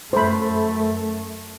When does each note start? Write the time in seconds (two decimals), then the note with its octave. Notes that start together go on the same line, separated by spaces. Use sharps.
0.13 F#2 A3 C5 B5